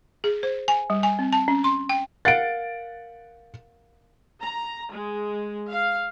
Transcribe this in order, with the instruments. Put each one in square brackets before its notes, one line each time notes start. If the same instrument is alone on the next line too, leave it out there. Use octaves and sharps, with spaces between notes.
[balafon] G#4
C5
G#5
G3
G#5
C4
A5
C#4
C6
G5
[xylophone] A#4 F5 [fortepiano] F#5 [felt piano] A6 D7
[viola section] A#5
G#3
F5